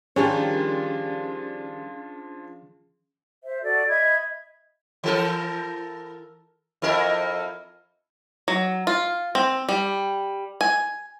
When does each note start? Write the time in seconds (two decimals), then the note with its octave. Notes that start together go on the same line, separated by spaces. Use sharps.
0.16 D#3 F3 G3 C#4 D4 F4 G#4 C#5
3.43 C5 E5
3.62 F#4 A4 D5
3.89 D#5 E5 B5 G#6
5.04 E3 A4 A#4
6.82 F2 E4 A#4
8.48 F#3
8.87 F4
9.35 C4
9.69 G3
10.61 G#5